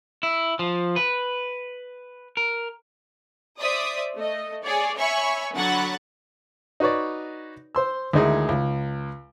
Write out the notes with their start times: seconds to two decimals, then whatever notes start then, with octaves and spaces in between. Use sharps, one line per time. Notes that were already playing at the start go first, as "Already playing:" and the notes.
0.23 E4
0.59 F3
0.96 B4
2.37 A#4
3.60 C5 D5 E5 D#6
4.15 A3 D#5
4.64 G#4 C#5 D5
4.97 C#5 E5 G#5 B5 C#6
5.54 D3 F#3 F#5 B5 C#6 A6
6.80 D#4 F#4 B4 C#5 D5
7.75 C5 C6 E6
8.13 D2 D#3 G#3 D#4 E4 G#4
8.49 C#2